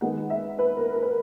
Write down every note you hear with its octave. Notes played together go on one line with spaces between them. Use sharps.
D#3 G#3 B3 D#4 F#5
E5
B4
A#4
A#4
B4